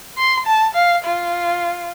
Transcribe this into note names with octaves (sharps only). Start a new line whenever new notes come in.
C6
A5
F5
F4